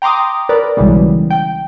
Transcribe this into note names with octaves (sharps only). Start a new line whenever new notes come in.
G5 A#5 C6 D6 D#6
A#4 B4 D5
B1 C#3 E3 G3 G#3
G5